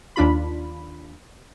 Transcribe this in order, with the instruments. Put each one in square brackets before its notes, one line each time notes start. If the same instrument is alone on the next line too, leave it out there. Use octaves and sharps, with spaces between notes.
[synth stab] D#2 D4 F4 B5